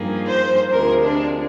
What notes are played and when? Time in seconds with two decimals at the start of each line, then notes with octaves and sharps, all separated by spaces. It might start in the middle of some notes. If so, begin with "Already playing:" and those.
Already playing: G2 F3 A#3 D#4 G#4
0.28 C5
0.72 D2 C3 F3 G#3 A#4
1.03 D4